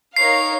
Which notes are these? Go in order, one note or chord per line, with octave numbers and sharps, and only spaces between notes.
D#4 A#4 C#5 F5 C7